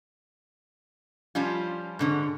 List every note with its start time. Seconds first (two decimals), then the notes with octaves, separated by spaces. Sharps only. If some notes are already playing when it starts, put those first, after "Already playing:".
1.35 F3 G3 C#4 F4
1.99 G#2 D3 C#4